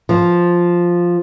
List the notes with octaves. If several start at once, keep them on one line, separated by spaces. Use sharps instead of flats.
F3